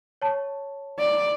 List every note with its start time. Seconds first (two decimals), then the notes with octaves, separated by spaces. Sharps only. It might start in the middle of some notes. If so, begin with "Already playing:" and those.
0.22 C#5 A5
0.99 D5